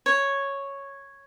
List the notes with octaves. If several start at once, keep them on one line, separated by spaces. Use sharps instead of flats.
C#5